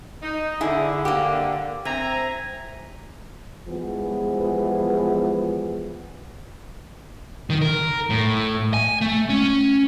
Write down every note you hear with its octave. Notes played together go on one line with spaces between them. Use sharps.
D#4
D3 E4 G#4
A#3 G4
C4 E5 G#5 A#5
E3 F3 G3 G#3 B3 G#4
D#3
A#4
A2
G#5
A3
C#4